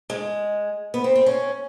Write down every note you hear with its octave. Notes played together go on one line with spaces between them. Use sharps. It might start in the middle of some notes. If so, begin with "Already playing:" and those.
G#3
B3
C4
C4
C#4